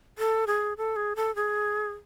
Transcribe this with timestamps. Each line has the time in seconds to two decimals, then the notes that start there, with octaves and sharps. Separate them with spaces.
0.18 A4
0.47 G#4
0.78 A4
0.96 G#4
1.16 A4
1.36 G#4